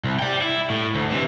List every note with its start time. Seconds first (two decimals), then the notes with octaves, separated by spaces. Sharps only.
0.04 C2
0.19 D5 G5
0.41 E4
0.70 A2
0.95 D2
1.10 C3 E3